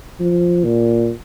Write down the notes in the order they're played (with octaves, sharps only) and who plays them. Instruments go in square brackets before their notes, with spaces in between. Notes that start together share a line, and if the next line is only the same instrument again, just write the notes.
[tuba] F3
A#2